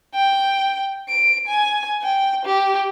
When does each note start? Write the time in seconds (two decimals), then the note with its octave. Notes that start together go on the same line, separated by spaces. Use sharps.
0.14 G5
1.09 D7
1.47 G#5
2.02 G5
2.45 G4